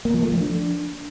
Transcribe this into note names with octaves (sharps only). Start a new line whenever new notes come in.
A#3
F3
A3
F3
D4